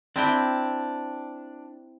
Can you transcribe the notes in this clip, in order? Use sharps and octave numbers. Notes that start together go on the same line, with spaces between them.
C4 D4 E4 G5